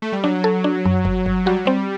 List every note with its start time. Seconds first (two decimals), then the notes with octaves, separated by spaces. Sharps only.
0.02 A3
0.12 G3
0.24 F#3 D4
0.44 A4
0.64 D4
0.85 F#2
1.05 G1
1.26 G1
1.46 G3 F#4
1.56 F#3
1.65 G3 C4